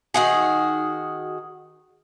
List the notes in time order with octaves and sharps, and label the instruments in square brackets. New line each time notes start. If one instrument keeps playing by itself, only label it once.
[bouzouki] D#3 F#4 G#4